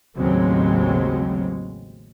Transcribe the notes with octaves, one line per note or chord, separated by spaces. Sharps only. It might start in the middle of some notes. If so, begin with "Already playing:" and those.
A1 D#2 C#3 F#3 G#3 C4